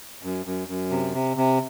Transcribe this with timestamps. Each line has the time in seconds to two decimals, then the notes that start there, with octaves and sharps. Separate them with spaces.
0.23 F#2
0.46 F#2
0.68 F#2
0.90 C3
1.14 C3
1.37 C3